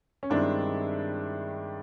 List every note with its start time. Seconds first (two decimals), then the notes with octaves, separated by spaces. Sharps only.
0.23 C#4
0.30 G2 D#3 G#3 C4 D4 E4